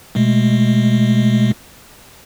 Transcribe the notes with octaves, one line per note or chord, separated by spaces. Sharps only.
B2 G#3 A3